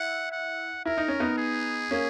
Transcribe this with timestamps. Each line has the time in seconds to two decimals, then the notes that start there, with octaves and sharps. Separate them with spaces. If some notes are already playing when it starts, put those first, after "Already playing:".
Already playing: E4 F#5
0.32 F#5
0.85 E4 A#4
0.98 D#4
1.08 C#4
1.20 B3 D#4
1.38 G#4
1.91 A#3 C#4